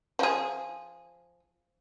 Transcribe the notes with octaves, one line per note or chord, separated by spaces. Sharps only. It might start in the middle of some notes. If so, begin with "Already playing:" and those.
F3 G#4